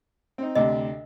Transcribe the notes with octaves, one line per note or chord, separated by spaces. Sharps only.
C4 D#4
D2 C3 D4 D#5